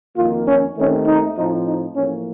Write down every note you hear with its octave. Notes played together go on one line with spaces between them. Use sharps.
F2 D#3 A#3 F4
C#4
D#2 D#3 A3 C4 C#4
D#4
A2 F3 C4 D#4
D#4
A1 A2 F3 A#3 C#4